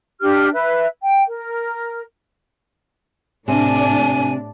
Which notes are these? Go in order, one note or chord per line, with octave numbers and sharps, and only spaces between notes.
D4 G4 F6
B4 E5
G5
A#4
A2 C3 D4 G#5